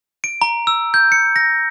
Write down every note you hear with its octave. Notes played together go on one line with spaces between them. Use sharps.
D7
A#5
E6
G6
C#7
A#6